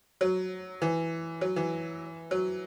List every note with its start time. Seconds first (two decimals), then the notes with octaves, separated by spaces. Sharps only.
0.21 F#3
0.82 E3
1.41 F#3
1.56 E3
2.31 F#3